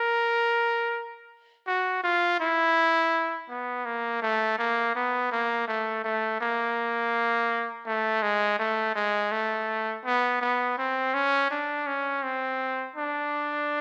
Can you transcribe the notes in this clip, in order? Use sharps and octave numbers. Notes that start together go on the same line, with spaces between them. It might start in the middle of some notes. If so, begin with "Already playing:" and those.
Already playing: A#4
F#4
F4
E4
B3
A#3
A3
A#3
B3
A#3
A3
A3
A#3
A3
G#3
A3
G#3
A3
B3
B3
C4
C#4
D4
C#4
C4
D4